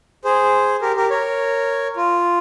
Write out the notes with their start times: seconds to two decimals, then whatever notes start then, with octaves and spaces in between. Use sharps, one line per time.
0.24 G#4 C5
0.82 G4 A#4
0.96 G4 A#4
1.10 A#4 C#5
1.96 F4